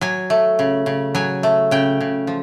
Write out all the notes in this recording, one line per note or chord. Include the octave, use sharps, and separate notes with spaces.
F#3 G#5
A3
C#3
C#3
F#3 G#5
A3
C#3 G5
C#3
F3